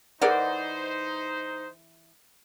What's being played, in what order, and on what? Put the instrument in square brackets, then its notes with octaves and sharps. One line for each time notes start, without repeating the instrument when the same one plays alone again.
[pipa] E3 A#4 D5 [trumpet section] D#4 C5 [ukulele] G#4 D#5 F#5